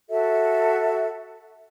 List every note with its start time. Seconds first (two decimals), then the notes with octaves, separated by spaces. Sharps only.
0.10 F#4 A4 E5